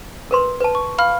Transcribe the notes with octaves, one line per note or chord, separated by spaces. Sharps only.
A#4 B4 C6
B4 A5
C#6
F5 B5 F6